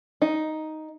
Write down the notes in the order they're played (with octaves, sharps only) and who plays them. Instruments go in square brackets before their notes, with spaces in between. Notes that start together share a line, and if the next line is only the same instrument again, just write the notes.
[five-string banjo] D#4